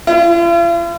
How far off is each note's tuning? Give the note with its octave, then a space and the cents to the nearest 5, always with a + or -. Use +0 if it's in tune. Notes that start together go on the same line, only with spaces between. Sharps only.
F4 -45